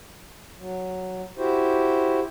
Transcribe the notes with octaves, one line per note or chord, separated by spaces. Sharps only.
F#3
E4 F#4 G4 C5